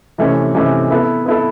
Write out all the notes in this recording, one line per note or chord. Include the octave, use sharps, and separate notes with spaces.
C3 E3 A3 C#4
C3 E3 A3 C#4
B3 E4 A4
B3 E4 A4